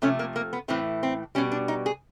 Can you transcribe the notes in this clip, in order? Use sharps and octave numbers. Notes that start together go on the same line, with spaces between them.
C3 F3 A3 C#4
A#3
A#3
B3
A2 E3 A3 C4
C4
B2 G3 C#4
D4
D#4
G#4